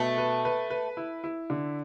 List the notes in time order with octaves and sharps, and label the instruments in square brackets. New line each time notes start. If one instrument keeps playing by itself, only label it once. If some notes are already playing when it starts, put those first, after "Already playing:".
Already playing: [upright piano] B2 [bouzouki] A3
[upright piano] B4
B4
B4
E4
E4
D3